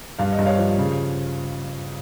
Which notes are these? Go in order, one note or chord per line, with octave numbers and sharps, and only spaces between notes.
G2 F5
D#5
G2
C#5 F5
F3
C#3